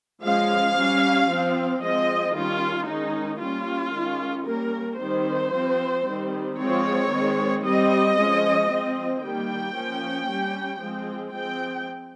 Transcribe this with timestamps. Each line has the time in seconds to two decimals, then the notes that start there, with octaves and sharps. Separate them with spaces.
0.23 F3 G#3 C#4 F5
0.77 G3 C#4
1.29 F3 C4
1.82 F3 G#3 C4 D#5
2.35 D#3 G3 C#4 F4
2.87 D#3 G#3 C#4 D#4
3.41 G3 A#3 C#4 F4
3.94 D#3 G#3 C#4
4.46 G3 A#3 C#4 A#4
5.00 D#3 G3 C4 C5
5.52 F3 C4
6.05 D#3 G3 C4
6.58 F3 G#3 C4 C#5
7.10 D#3 G#3 C4
7.64 G3 C4 D#5
8.16 F3 G#3 C#4
8.70 F3 C4
9.22 D#3 G3 A#3 G5
9.75 F3 A#3 C#4
10.28 G3 C#4
10.81 F3 G#3 C4
11.33 F3 G#3 C4 G5